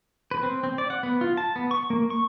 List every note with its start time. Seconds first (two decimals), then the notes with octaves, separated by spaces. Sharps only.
0.31 B4
0.43 C4
0.63 C4
0.78 D5
0.90 F#5
1.03 B3
1.21 F4
1.37 A5
1.56 B3
1.71 C#6
1.90 A#3
2.10 C#6